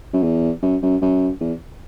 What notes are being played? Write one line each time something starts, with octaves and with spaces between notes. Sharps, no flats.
F#2
E2
F#2
F#2
F#2
E2